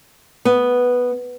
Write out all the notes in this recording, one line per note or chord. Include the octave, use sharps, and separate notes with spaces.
B3